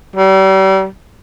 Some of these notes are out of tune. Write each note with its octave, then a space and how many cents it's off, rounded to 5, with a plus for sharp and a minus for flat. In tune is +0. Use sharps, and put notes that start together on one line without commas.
G3 -35